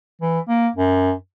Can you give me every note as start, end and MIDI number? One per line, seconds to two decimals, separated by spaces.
0.21 0.40 52
0.48 0.68 58
0.76 1.13 42